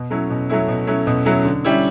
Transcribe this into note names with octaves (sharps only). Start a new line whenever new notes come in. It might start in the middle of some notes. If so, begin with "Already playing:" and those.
Already playing: B2
F#3 A3 C#4 E4
B2
F#3 A3 C#4 E4
B2
F#3 A3 C#4 E4
B2
F#3 A3 C#4 E4
D3
G3 C#4 E4